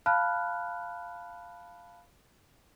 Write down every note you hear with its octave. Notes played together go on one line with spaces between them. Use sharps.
F5 A5 B5 F6 F#6